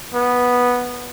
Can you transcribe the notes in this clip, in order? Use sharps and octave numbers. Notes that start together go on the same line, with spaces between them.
B3